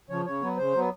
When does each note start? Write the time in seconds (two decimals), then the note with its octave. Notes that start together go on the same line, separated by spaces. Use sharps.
0.09 C#3 F3 C#5
0.26 C#3 C#5
0.42 F#3 B3
0.58 C#3 C5
0.74 F#3 B3